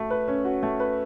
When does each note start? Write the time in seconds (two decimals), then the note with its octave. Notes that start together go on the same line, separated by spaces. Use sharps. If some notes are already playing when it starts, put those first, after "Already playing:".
Already playing: A3 F#4
0.11 B4
0.28 C#4
0.45 F#4
0.63 A3
0.80 B4